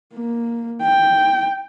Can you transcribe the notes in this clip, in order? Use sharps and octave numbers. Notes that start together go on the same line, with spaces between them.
A#3
G5